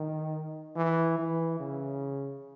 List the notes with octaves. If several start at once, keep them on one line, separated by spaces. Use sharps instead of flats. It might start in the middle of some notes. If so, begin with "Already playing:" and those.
Already playing: D#3
E3
E3
C#3